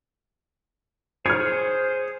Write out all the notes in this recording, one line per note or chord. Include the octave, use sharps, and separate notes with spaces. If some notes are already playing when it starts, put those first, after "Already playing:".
G#4 C5 C#5 F6 G#6